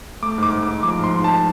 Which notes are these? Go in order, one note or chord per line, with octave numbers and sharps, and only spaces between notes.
A3 D6
G#2 D6
G#2
D6
G#2
F3 D6
G#2 C6
G#2
A5